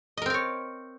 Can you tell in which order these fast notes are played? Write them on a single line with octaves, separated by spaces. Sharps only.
D#5 A#4 C4 F5 C#5